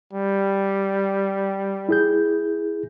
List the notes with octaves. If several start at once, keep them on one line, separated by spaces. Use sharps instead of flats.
G3
E4 G#4 G6